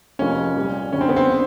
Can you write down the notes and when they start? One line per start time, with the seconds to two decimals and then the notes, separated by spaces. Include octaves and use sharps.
0.19 F1 F2 C3 F3 A#3 C#4
0.56 C2 A#2 G3
0.93 F#2 D3 G3 C#4
1.01 C4
1.09 B3
1.16 C4
1.31 D3